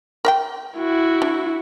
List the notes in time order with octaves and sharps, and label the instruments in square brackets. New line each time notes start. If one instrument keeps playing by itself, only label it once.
[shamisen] A#4 E5 G5
[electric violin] E4 F#4
[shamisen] D4